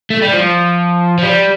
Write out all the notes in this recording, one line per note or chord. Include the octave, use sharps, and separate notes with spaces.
A3
G3
F3
F3
G3